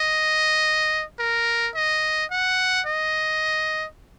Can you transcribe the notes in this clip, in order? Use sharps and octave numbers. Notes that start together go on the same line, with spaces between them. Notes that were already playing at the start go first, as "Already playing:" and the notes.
Already playing: D#5
A#4
D#5
F#5
D#5